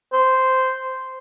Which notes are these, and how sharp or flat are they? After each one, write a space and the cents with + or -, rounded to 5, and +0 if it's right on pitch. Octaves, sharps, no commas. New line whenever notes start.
C5 -10